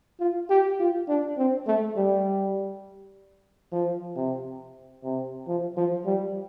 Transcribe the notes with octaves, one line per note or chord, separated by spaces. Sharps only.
F4
G4
F4
D4
C4
A3
G3
F3
C3
C3
F3
F3
G3